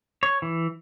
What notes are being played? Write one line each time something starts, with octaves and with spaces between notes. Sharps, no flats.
C#5
E3